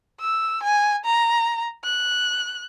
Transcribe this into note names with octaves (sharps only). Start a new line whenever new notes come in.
E6
G#5
A#5
F#6